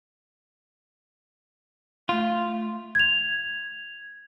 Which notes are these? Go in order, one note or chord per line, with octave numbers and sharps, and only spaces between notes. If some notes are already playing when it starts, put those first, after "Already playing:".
A3 F4
G#6 F7